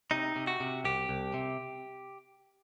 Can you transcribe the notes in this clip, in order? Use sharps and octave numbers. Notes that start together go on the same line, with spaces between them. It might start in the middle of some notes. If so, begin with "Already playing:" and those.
C3 D#4
C3
F#4
C3
C2 G4
C2
C3